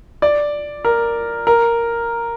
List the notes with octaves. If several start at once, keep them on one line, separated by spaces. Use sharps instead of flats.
D5
A#4
A#4